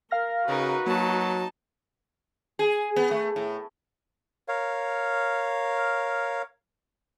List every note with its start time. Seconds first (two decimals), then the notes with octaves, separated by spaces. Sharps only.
0.11 A#4 F5 F6 A#6
0.48 C#3 D#4 F#4 A#4 B4
0.87 F#3 A#3 D#4 A5
2.59 G#4
2.96 B3
3.11 A3
3.36 A2
4.48 A#4 C#5 F5